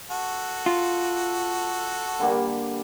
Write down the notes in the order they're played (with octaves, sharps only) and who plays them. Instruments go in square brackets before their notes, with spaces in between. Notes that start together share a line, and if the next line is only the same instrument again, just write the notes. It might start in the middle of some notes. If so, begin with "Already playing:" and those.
[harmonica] F#4 A4
[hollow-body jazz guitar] F4
[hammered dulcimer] D3 G3 A#3